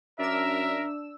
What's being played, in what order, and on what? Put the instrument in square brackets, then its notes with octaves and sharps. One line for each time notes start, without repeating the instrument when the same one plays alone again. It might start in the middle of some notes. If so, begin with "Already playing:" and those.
[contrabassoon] F#2 [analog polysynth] D4 E6 [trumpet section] A#4 [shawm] E5